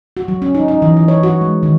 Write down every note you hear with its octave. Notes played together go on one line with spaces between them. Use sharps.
F#4
F#3
C#4
D#4
D#4
E3
E3
C#5
F#4
G#3
D#3